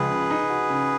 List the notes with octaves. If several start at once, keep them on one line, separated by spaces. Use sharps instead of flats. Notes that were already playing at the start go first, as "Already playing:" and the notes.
Already playing: C#2 F3 G#3 G#4 B4
C#3
D#4
F#4
C#3